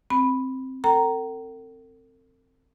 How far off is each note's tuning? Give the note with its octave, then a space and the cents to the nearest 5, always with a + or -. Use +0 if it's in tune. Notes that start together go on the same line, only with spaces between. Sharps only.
C4 +0 B5 +0
A4 +45 G5 -45 A#5 +0